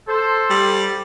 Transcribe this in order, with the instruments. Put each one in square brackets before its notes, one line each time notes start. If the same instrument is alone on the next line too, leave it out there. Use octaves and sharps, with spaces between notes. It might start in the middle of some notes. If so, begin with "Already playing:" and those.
[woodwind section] A4 C5
[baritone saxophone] G3